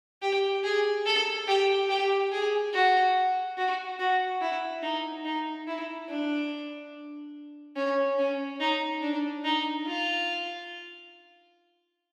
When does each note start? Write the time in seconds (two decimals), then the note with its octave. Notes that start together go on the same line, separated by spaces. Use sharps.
0.22 G4
0.64 G#4
1.06 A4
1.48 G4
1.89 G4
2.32 G#4
2.73 F#4
3.57 F#4
3.99 F#4
4.41 E4
4.83 D#4
5.25 D#4
5.67 E4
6.09 D4
7.77 C#4
8.18 C#4
8.60 D#4
9.02 D4
9.45 D#4
9.87 F4